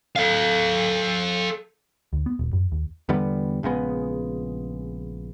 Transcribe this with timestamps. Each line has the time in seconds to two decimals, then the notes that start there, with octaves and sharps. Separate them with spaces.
0.16 A4 F5
2.13 D2
2.26 B3
2.39 D#1
2.53 F#2
2.72 D#2
3.09 E2 D3 G3 B3
3.63 A#1 C#3 G#3 B3